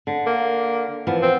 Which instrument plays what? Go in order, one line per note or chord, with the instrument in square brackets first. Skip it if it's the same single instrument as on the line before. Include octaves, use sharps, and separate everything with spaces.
[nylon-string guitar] D3
[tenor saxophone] A#3
[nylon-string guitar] E3 F3 B3
[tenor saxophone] C4